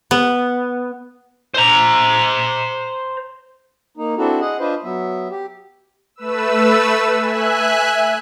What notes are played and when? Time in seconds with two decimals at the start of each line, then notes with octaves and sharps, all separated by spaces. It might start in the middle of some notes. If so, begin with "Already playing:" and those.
0.11 B3
1.54 C5 A#5
3.97 A#3 D#4
4.17 C4 D4 E4 F#4 A4
4.41 G#4 D#5 F#5
4.60 D4 F4 B4 C5 D#5
4.83 F#3 B3 E5
5.30 G4
6.16 A3 B4 E6
7.18 E5 G#5 F#6